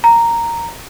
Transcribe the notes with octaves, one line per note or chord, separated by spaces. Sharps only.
A#5